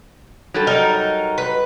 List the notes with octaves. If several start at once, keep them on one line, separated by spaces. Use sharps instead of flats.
F#3 G3 A4
D#4 A#4
B4